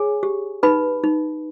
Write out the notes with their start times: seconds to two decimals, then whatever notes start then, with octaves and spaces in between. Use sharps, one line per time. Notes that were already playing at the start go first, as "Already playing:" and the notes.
Already playing: G#4 C#5 G#5
0.23 G4
0.63 D#4 B4 B5
1.04 D#4